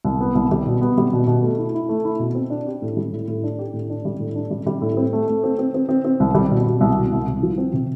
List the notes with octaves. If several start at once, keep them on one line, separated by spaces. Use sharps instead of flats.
C2
B3
C2
G3
B2
B3
G3
B2
B2
A3
E4
E4
A3
E4
B2
C4
D4
G4
A2
G3
A2
A2
D4
G4
A2
D4
G3
A2
D4
G3
G3
A2
C4
A3
A3
C4
C4
C4
C4
C4
C2
G3
B2
B2
C2
B2
C2
C2
F3
C4
C3